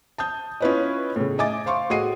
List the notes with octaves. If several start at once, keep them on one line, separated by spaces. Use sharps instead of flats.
A5 D#6 G6
C#4 E4 F4 B4 C#5 D#5
A2 C#3
D#5 E5 G#5 D6 A6
C5 F5 C6 C#6
A2 F#4 G#4 D#5 C7 D#7